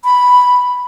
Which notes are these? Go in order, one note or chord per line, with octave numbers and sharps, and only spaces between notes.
B5